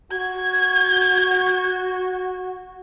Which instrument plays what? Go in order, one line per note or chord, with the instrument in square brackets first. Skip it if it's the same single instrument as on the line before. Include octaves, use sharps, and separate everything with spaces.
[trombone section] F#4 [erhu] G#6